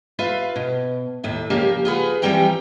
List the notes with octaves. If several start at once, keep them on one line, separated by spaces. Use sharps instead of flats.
F4 B4 E5 F5
B2
D#2 A2 E5
C#3 F3 A#3 G4 A#4
F4 G#4 B4 F#5
E3 F3 G3 C4 G5 A#5